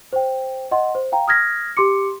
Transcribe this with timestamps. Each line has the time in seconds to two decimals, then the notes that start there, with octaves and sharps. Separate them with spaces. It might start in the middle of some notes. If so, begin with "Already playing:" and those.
0.13 C5 G5
0.71 D#5 F#5 C6
0.95 C5
1.12 F5 G5 A#5
1.28 D#6 F6 G#6 A#6 B6
1.77 G4 C6 D6 C#7